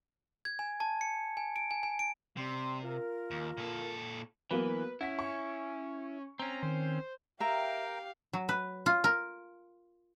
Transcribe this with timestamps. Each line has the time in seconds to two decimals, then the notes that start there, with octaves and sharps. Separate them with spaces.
0.45 G#6
0.59 G#5
0.80 A5
1.01 C#7
1.37 G#5
1.56 D7
1.71 G#5
1.83 G#5
1.99 D7
2.37 C3 G3 C4 C6
2.83 F4 A#4
3.31 D#2
3.57 A#2 A4
4.51 E3 F#3 A#3 B3 B4
5.01 C#4 E4 F#5 B6
5.19 C#6
6.39 C4 C#4 A#5
6.63 D#3 C5
7.40 G4 A#4 E5 F5 G5 A#5
8.33 F#3
8.49 B4
8.86 F4
9.04 A#4